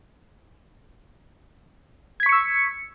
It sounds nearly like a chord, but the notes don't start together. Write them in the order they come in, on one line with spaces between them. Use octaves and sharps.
G#6 B6 C#6 C#7 E6